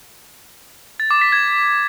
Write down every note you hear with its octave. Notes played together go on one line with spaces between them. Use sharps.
A6
D6
B6
G#6